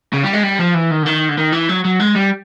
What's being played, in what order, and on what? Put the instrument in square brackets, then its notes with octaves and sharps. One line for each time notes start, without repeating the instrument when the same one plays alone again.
[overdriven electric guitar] C#3
G3
G#3
G3
F3
E3
D#3
D3
D#3
D3
D#3
E3
F#3
F#3
G#3
G3